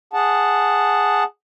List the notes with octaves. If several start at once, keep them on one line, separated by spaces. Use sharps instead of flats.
G#4 F#5 A5